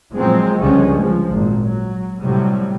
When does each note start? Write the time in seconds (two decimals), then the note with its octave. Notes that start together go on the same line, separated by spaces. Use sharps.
0.14 A#2 F3 F#3 G#3 C4
0.61 C#2 D3 F3 G3 G#3 C#4
1.02 F3 G#3
1.32 G#1 A#2
1.61 F#3
2.21 A2 C3 F#3 G3